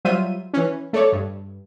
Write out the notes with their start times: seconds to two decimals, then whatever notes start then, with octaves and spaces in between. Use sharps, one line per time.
0.05 F#3 G3 F4 C5 E5 D#7
0.53 E3 C#4
0.93 A3 A4 C#5 D5
1.12 G2